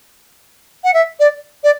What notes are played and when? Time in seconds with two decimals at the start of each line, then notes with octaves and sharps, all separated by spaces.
0.84 F#5
0.94 E5
1.20 D5
1.64 D5